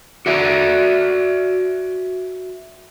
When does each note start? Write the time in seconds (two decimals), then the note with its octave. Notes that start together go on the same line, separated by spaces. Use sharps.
0.26 F#4 D5 E5